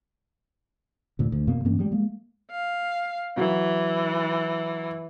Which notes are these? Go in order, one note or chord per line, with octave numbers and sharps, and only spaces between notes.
D2 A#2
D2
F2 B2 A#3
G2 E3 A#3 C#4
F3 G3 G#3
G#3 A#3
F5
E3 F#3